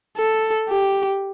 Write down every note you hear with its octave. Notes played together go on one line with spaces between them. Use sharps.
A4
G4